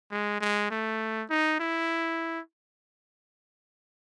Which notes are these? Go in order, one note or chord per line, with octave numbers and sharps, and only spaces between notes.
G#3
G#3
A3
D#4
E4